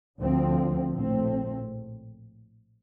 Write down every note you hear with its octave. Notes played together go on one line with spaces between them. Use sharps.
D2 D3 F3 C4
A#1 A2 A3 C4